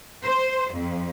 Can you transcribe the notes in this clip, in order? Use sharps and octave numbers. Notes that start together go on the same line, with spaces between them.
C5
F2